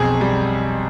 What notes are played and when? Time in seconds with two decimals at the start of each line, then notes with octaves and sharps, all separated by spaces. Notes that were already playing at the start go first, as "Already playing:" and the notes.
Already playing: B1 F2 G#4
0.21 G3